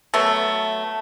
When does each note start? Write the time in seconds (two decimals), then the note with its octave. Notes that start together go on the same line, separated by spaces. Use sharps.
0.14 F#3 A3 B3